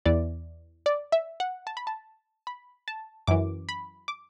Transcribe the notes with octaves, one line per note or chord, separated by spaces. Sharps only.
E2 E3 D5
D5
E5
F#5
A5
B5
A5
B5
A5
F#2 E3 D6
B5
D6